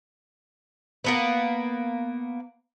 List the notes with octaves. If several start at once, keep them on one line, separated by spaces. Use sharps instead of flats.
A#3 B3 B4